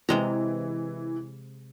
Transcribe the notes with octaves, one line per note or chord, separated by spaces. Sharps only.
C3 E3 G#3 A#5